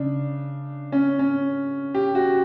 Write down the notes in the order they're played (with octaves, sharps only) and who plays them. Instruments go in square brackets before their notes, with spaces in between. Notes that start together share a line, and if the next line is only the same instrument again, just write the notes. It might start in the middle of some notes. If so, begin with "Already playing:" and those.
Already playing: [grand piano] C#3 [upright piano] D4
[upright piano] C#4
C#4
G4
F#4